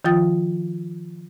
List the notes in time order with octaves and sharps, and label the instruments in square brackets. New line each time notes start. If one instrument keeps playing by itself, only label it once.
[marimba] D#3 F3 F4 G5 D#6 A6